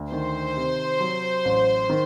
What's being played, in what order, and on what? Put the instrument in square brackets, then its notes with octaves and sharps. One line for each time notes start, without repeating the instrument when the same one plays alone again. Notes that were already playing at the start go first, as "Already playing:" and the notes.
Already playing: [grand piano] D2
[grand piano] D#3 [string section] C5
[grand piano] C3
F#3
A1
D#3